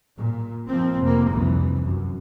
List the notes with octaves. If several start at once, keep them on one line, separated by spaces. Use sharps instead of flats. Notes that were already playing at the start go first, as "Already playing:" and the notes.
A#2
G#2 F3 A#3 C4
F1 A#3
F1 C2 E3
F#2